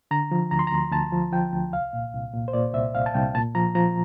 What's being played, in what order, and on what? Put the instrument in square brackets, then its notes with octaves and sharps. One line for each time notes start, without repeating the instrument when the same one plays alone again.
[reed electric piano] D3 A#5
F3
D2 A#5
C6
A#5
D2
D2 A5
F3
F3 G5
D2
C2 F5
A#2
C2
A#2
C5
A#2 D5
C2 E5
C2 F5
A5
C2 G5
A#2 A5
F3 A#5
F3 A#5